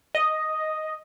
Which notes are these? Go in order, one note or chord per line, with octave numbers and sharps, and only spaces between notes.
D#5